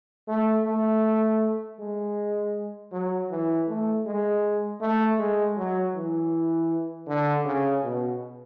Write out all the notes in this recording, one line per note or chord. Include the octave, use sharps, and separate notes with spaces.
A3
A3
G#3
F#3
E3
A3
G#3
A3
G#3
F#3
E3
D3
C#3
B2